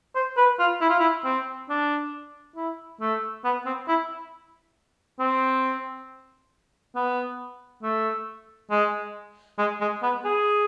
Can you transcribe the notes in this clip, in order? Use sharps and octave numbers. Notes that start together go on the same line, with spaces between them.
C5
B4
F4
E4
F4
E4
C4
D4
E4
A3
B3
C4
E4
C4
B3
A3
G#3
G#3
G#3
B3
G#4